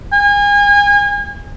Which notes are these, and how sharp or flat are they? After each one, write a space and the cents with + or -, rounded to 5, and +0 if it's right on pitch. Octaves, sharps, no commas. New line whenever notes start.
G#5 -35